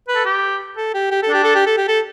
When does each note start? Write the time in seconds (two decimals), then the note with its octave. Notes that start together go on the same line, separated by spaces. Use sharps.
0.08 B4
0.15 A4
0.25 G4
0.77 A4
0.94 G4
1.11 G4
1.23 A4
1.29 D4 G4
1.44 A4
1.55 G4
1.67 A4
1.77 G4
1.88 A4